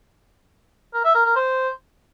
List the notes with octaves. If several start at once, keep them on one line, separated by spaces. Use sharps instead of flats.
A#4
E5
A#4
A#4
C5